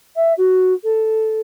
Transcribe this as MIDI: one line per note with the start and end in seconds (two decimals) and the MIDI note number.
0.15 0.32 76
0.37 0.73 66
0.83 1.40 69